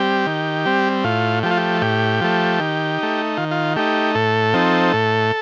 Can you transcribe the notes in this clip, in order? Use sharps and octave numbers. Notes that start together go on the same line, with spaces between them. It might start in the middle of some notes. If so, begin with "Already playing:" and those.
Already playing: G3 C4 G4
D#3
G3 C4
A2 F4
F3 A3 G4
F4
G4
A2 G4
F3 A3
D#3
A3 D#4
D#3 F4
F4
A3 D#4 G4
A2 A4
F3 C4 D#4
A2